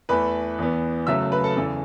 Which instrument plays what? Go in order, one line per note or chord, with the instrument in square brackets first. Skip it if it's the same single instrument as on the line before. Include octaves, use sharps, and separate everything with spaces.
[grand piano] E2 E3 A3 B4 B5
E2 E3 B3
F#1 F#2 C#3 F#3 A3 E5 E6
B4 B5
A4 A5
E2 C#3 E3